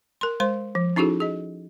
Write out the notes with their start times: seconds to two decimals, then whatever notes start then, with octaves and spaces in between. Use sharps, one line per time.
0.21 A#4 C6
0.40 G#3 C5 C6
0.75 F3
0.96 C#4 D#4 E4 F#4 G#4 A4
1.20 G#4 D#5